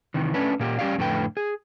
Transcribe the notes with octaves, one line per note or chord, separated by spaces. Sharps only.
C3 D#3 E3
A3 C#4 D4 B4
A#2 A#3 G4
G3 C#4 G4 D5 F5
F2 A2 D3 A3 B4 G5
G#4